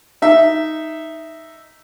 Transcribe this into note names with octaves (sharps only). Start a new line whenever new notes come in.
D#4 E5